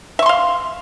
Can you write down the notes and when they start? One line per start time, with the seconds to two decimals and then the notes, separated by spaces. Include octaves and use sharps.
0.19 E5
0.22 C#6
0.26 C6
0.29 F5